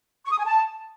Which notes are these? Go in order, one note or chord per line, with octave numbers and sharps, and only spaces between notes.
C#6
D#6
G#5
A5